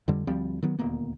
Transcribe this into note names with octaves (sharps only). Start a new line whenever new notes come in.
F2 D3 G3
D2 F3 G3 C4
D#3 F#3 B3
D#1 D2 A#3 B3